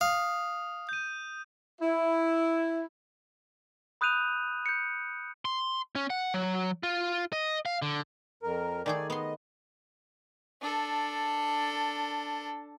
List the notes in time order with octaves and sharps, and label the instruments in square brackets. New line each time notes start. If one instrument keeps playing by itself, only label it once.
[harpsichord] F5 [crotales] D#6
[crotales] G6 D#7
[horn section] E4
[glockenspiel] B5 D#6 F#6 G6 D#7 F7
G6 C#7
[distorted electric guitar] C6
C#4
F#5
F#3
F4
D#5
F5
D3
[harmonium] F2 A#4
[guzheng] D#3 A3 G#4 [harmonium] D5 G#5
[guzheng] B3 C6 [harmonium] D#5
[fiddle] D4 A4